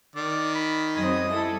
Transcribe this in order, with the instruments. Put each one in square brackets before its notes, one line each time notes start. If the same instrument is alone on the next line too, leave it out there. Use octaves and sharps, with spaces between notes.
[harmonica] D#3 [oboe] D5
[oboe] B5
[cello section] F#2 F#3 C4 [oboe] G#4 [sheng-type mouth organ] D#5 D#6
[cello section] G3 E4 A4 [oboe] G#4